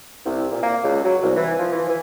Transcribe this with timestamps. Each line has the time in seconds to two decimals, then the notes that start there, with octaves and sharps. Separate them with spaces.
0.24 C2
0.51 A#2
0.63 A#3
0.83 C#2
1.04 F#3
1.22 C2
1.36 E3
1.58 F3
1.71 E3
1.88 E3